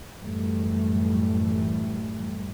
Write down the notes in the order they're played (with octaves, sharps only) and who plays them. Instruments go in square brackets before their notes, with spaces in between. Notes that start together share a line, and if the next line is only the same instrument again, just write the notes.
[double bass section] F#2 A2 E3 G3 A3